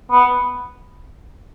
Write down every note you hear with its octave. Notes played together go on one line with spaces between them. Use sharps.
B3